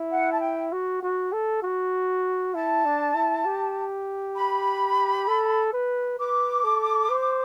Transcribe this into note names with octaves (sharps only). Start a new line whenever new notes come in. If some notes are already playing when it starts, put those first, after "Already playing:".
Already playing: E4
F#5
A5
G5
F#4
F#4
A4
F#4
E4 A5
D4
E4
G4
B5
A4
B4
B4 D6
A4
C5